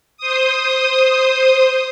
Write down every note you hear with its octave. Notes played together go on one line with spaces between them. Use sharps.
C5 D#6